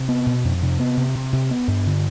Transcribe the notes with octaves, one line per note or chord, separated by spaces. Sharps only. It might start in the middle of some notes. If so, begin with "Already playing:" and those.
Already playing: C3
B3
B2
F2
C3
B3
C3
C3
C3
B3
G2
D3